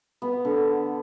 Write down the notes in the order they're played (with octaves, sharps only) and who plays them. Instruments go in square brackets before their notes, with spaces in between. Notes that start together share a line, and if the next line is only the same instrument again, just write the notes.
[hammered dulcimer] B3
D3